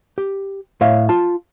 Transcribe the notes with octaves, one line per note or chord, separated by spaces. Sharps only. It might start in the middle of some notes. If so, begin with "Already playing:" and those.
G4
A2 C#5 E5 F5
F4 A5